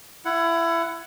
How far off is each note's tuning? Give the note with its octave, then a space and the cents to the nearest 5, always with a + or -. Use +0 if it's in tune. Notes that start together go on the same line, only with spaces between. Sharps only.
E4 +25 F#5 +0